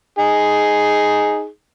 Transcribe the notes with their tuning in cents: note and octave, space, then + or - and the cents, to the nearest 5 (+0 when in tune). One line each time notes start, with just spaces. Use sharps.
D#4 +0 G#4 +5